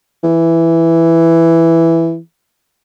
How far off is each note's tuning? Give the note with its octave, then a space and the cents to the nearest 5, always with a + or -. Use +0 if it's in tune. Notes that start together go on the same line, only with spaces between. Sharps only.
E3 +5